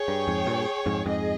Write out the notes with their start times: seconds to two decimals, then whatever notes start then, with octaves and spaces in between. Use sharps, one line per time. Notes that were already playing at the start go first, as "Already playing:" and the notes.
Already playing: G#4 C#5 G5
0.08 G2
0.28 F2 G#2
0.47 G2 A#2
0.86 F2 G#2
1.06 F2 G#2 G#4 D#5